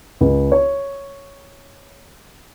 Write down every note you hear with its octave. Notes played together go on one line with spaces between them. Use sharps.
C#2
C#5